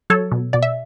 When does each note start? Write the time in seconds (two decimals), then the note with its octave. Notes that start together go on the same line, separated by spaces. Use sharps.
0.10 F#3 A4 C#5
0.32 B2
0.53 B2 D5
0.63 E5